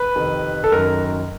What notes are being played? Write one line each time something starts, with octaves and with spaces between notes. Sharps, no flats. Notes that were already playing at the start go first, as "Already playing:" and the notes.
Already playing: B4
F2 C3 D#3
A4
F#2 D#3 A#4